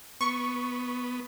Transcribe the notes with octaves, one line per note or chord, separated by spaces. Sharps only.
B3 C#6